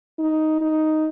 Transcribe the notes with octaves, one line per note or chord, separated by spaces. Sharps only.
D#4
D#4